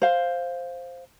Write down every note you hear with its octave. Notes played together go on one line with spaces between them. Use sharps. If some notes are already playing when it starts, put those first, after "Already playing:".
C5 F5